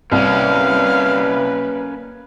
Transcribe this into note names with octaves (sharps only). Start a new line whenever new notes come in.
C2 A#3 C#4 B4 F5